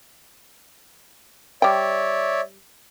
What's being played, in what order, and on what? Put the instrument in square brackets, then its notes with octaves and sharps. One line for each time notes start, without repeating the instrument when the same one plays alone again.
[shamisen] G3 G5 [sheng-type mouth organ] C#5 D5 E5